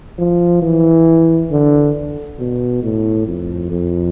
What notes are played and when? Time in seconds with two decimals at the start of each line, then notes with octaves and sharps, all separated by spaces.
0.18 F3
0.62 E3
1.51 D3
2.39 B2
2.82 A2
3.27 F2
3.70 F2